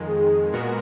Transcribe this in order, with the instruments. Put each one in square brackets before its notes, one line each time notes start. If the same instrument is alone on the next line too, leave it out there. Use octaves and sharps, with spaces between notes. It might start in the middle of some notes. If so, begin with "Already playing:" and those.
Already playing: [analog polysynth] F2 D#3 G#3
[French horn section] G#4
[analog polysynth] A#2 G#3 B3 F#4 A#4